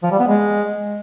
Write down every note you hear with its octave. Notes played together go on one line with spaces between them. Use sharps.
F3
G3
B3
G#3